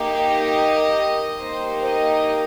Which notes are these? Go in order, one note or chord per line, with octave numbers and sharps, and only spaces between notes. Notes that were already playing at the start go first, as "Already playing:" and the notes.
Already playing: A#3 D#4 G4
D#5
A#3 D#4 G4 C5
D#5